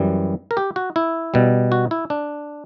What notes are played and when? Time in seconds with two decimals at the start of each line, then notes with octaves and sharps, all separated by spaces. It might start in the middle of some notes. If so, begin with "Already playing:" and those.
Already playing: F#2 E3 G3
0.51 A#4
0.57 G4
0.76 F#4
0.96 E4
1.34 B2 G3
1.72 F#4
1.91 E4
2.10 D4